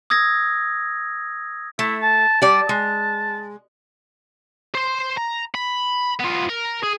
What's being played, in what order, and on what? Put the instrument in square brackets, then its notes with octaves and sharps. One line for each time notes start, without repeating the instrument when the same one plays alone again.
[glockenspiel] D#6 E6 G#6 A#6
[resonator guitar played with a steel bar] A3 [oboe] E4
[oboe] A5
[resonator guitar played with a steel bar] G3 D5 [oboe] A5
[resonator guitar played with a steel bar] G#3
[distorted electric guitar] C5 C6
A#5
B5
B3 F4
A#4
G#4